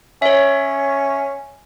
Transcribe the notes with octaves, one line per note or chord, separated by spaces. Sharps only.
C#4 C#5 E5